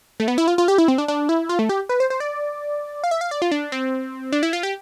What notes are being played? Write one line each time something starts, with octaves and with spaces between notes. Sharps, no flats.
A3
B3
E4
F4
F4
G4
E4
C4
D4
D4
E4
F4
A3
G4
B4
C5
C5
D5
F5
E5
F5
D5
F4
D4
C4
D4
E4
F4
G4